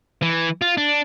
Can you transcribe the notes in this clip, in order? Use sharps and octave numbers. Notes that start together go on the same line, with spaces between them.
E3
F4
D4